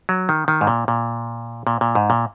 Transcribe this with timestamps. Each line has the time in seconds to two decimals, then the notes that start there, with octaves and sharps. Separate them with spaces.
0.09 F#3
0.29 D#3
0.48 D#3
0.61 G#2
0.67 A#2
0.88 A#2
1.67 A#2
1.81 A#2
1.95 G#2
2.10 A#2